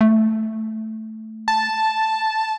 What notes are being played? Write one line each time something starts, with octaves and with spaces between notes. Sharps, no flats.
A3
A5